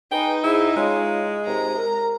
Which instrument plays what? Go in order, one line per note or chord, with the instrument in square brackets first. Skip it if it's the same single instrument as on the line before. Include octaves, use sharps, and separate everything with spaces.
[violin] D#4 [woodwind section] G#4 B4 [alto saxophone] G5
[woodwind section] G#2 [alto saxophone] E4
[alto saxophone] G#3 [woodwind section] C#4 F4
[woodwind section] D#2 C3 [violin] A#5
[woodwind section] A#4